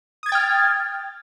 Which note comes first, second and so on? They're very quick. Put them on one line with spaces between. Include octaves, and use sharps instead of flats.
D#6 G#6 A6 G5 F6